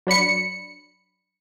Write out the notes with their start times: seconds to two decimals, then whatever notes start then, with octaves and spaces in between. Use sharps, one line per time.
0.07 F#3 D4 B5 C#7